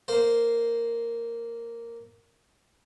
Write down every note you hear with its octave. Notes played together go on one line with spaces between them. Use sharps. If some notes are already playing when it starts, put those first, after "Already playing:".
A#3 C5